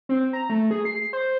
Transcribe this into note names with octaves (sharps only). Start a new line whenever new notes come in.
C4
A#5
A3
G#4
C7
C5